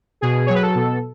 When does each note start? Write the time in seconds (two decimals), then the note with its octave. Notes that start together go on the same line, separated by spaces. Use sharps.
0.21 B2 G#4
0.46 F#3 C#5
0.55 B4
0.62 A4
0.75 B2